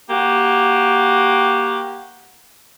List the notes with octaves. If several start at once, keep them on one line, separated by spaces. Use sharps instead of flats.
A#3 F#4 G4